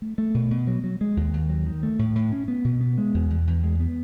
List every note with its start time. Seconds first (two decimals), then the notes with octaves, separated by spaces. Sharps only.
0.02 A3
0.18 A3
0.34 B2
0.51 B2
0.67 F#3
0.84 F#3
1.01 G#3
1.17 D#2
1.34 D#2
1.49 F#3
1.66 D#3
1.83 A3
1.99 A2
2.15 A2
2.32 C#4
2.48 B3
2.64 B2
2.81 B3
2.98 G#3
3.14 E2
3.30 E2
3.47 E2
3.64 G#3
3.80 B3